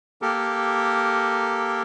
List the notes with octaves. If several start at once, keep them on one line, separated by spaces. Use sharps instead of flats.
A#3 G4 A4 A#4